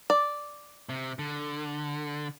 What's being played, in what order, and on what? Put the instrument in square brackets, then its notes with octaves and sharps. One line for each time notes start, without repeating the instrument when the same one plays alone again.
[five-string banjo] D5
[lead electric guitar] C3
D3